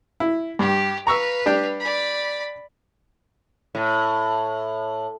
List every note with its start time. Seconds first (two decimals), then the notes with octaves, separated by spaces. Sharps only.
0.20 E4
0.59 G2 G4
1.07 B4 F5 A#5 C#6 E6
1.46 G3 D4 G4
1.80 D5 B5
3.75 A2